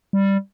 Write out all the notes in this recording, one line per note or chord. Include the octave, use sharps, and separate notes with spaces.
G3